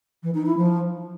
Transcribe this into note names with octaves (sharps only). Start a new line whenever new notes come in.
E3
D#4
E4
F3